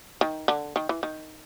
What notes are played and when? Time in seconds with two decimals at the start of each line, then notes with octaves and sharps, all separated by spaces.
0.21 D#3
0.48 D3
0.76 D#3
0.89 E3
1.03 D#3